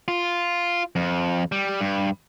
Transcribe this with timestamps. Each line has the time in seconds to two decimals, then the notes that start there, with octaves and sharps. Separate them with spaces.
0.08 F4
0.96 F2
1.52 G3
1.81 G2